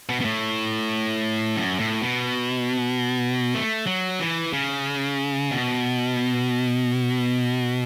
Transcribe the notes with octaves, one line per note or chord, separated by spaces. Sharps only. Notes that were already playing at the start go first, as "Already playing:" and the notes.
B2
B2
A2
F#2
A2
B2
A3
F#3
E3
C#3
B2